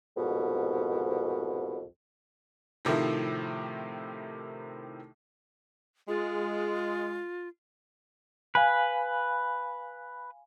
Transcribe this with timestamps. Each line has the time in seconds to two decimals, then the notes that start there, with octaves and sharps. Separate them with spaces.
0.17 C2 F2 G#2 B2
2.85 A2 C3 D#3 F3 E4
6.08 G#3 F4
8.55 B4 F5 G#5 B5